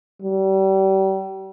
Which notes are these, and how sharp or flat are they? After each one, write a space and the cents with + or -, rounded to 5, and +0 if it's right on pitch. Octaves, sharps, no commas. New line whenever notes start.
G3 -35